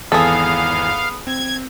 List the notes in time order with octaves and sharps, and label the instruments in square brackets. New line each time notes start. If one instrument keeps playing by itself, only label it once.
[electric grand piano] G#1 E2 E3 [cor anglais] B3 [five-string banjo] G#4 A4 [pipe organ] F5
[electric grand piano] C4 [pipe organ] G#6